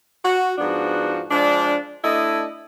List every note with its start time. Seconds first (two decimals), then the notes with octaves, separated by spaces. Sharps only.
0.23 F#4
0.58 G#2 F3 B3 D4 F#4
1.30 F3 G#3 D4
2.04 A3 D4 E4 D#5